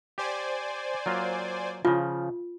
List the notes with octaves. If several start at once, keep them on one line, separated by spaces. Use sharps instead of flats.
G4 C5 D5 G#5
F#3 A#3 F4
C#3 F3 F4